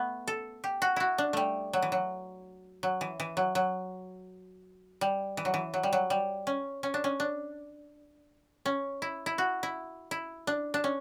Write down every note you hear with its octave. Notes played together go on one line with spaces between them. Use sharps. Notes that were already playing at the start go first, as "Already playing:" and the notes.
Already playing: A3 B3
A4
G4
F#4
E4 F#4
D4
G3 A3
F#3
E3
F#3
F#3
E3
E3
F#3
F#3
G3
E3
F#3
E3
F#3
G3
F#3
G3
C#4
C#4
D4
C#4
D4
C#4
E4
E4
F#4
E4
E4
D4
D4
C#4